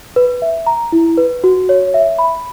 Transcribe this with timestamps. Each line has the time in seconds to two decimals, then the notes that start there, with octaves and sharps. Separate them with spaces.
0.16 B4
0.42 E5
0.67 A#5
0.92 E4
1.17 B4
1.44 F#4
1.69 C#5
1.94 E5
2.19 B5